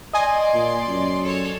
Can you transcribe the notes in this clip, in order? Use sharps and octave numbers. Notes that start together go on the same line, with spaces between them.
D5 D#5 G#5 C6
A#2
F#2
A4 C#5